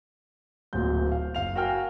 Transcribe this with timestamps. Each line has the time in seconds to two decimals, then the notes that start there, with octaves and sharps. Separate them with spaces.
0.73 D1 D2 A#2 G6
1.12 F5
1.35 F#1 F5 F7
1.56 F#4 A#4 F5 G5 G#5 F6